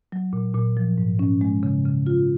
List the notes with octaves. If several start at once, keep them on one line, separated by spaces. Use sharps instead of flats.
F#3
A#2
A#2
F3
G#2
C#4
G#3
C#3
C#3
F4